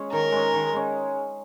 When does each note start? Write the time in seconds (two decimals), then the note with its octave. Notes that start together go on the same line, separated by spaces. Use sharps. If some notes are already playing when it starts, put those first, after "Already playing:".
Already playing: G#3 C#4
0.11 D#3 A#4
0.32 G#3 C#4
0.53 D#3
0.73 G#3 C#4